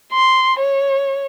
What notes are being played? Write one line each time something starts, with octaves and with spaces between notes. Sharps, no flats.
C6
C#5